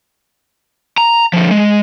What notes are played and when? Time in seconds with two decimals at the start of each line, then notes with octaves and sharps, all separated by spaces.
0.98 A#5
1.33 D3 F3
1.51 G#3